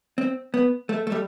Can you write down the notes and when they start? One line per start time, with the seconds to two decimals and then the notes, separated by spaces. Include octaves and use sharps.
0.18 C4
0.54 B3
0.89 A3
1.07 A3
1.12 G3